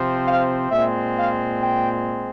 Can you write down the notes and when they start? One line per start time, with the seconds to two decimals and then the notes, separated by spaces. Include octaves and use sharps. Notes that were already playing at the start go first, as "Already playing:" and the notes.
Already playing: C3 F3 C4
0.27 F5
0.71 A#2 G#3 C4 E5
1.16 F5
1.61 G5